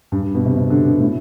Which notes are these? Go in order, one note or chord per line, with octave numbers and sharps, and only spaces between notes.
G2
G2
B2
C3
C3
D3
B2
A2